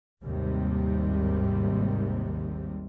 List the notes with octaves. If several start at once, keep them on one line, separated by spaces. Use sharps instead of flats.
G#1 D#2 G#2 C3 G3